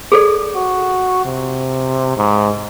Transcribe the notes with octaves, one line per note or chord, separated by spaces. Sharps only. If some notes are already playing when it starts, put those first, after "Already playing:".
G#4 A4 D5
F#4
C3
G#2